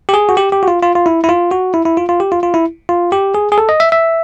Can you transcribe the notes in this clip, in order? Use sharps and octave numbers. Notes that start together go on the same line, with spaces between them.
G4
G#4
F#4
G4
G4
F#4
F4
F4
F4
E4
E4
F4
F#4
E4
E4
F4
F4
G4
F4
F4
E4
F4
G4
G#4
G#4
A4
D#5
E5
E5